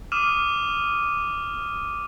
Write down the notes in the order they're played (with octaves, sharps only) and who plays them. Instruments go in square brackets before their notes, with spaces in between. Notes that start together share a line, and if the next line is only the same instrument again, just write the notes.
[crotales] D6 D#6 F6 D#7 E7